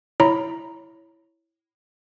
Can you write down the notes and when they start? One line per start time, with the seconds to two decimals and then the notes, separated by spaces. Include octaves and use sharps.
0.20 E4 C#5 A#5 B5